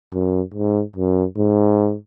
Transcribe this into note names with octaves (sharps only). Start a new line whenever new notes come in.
F#2
G#2
F#2
G#2